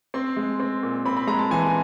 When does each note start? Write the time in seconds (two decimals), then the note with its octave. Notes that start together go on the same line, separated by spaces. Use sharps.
0.14 C4 C6
0.37 G#3
0.60 C4
0.83 A#2
1.05 C4 B5
1.17 B5
1.27 G#3 A#5
1.39 A5
1.51 E3 G#5